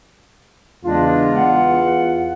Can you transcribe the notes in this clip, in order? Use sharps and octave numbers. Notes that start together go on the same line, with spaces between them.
E2 C#3 G#3 D4 F4
F#5